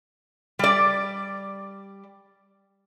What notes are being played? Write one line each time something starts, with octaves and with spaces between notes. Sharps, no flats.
G3 D5